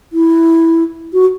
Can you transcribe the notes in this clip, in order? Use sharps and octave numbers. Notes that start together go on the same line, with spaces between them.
E4
F#4